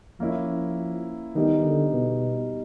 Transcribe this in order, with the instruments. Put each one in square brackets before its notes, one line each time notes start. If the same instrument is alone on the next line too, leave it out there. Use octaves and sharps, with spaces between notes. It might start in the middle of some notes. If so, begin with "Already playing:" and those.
[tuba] F3 [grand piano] A#3 C#4 E4
[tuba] D#3 [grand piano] G3 B3 D#4
[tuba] D3
B2